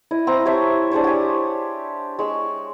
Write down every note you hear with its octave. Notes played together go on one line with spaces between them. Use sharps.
E4 D#5
C4 A#5 D6
G4 C#5 E5 A5
D4 G#4 C5 C#5
G4 G#5
G#3 C#6 E6